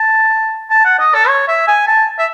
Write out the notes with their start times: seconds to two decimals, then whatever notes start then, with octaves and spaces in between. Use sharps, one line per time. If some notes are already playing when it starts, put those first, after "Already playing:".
Already playing: A5
0.70 A5
0.85 F#5
0.99 D#5
1.14 A4
1.28 C#5
1.48 E5
1.68 G#5
1.87 A5
2.19 E5